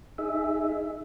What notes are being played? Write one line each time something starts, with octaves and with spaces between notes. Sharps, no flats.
D#4 G#4 E5